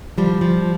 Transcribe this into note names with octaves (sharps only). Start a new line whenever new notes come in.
F3 G3
F3